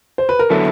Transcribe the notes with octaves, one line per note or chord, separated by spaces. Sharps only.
C5
B4
A#4
D3 F#3 B3 E4 A4